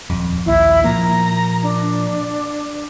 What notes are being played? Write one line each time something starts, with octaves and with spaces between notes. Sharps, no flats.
D#1 F2
A#1 D#2 E4
A#2 F3 A#3 A#5
D4